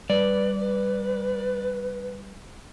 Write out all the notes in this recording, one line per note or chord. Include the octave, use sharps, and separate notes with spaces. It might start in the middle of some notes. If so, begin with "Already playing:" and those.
G3 B4 D5
B4